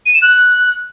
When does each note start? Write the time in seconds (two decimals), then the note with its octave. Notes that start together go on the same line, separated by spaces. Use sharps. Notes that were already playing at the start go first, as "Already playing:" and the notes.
0.06 D#7
0.14 E7
0.22 F#6